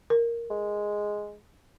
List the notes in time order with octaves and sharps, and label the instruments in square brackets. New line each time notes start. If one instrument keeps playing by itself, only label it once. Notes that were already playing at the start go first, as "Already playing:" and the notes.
[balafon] A#4
[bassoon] G#3